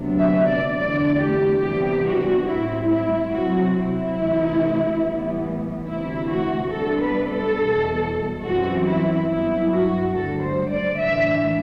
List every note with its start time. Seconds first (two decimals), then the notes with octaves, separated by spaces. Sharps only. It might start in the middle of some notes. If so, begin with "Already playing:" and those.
Already playing: D2 C3 F#3 B3 D4
0.17 E5
0.46 D5
0.74 E2 D3 A3 D4 D5
1.17 G4
1.60 C3 E3 G3 B3 D4 G4
2.03 F#4
2.45 A2 G3 C4 E4
2.87 E4
3.30 C3 F#3 C4 F#4
3.73 E4
4.15 D2 C3 E3 A3
5.01 A2 E3 G3 B3
5.86 D2 C3 E3 E4
6.29 F#4
6.71 C3 G3 B3 D4 A4
7.01 B4
7.29 A4
7.57 E2 B2 G3
8.43 F#2 E3 G3 C4 F#4
8.85 E4
9.28 G2 F#3 B3 E4
9.71 F#4
10.13 D2 D3 G3 A4
10.42 C5
10.70 D5
10.98 A2 E3 A3 D4 E5